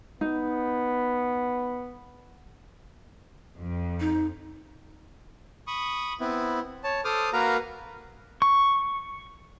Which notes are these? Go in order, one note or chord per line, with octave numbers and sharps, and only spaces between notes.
B3 D#4
F2
D#4
B5 C#6 D#6
B3 C4 E4
C#5 A5
A4 C5 D6 D#6 F6
A#3 F#4 A#4 B4 F5 A#5
C#6